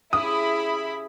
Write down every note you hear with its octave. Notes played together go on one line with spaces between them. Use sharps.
C#3 E4 G4 B5 D#6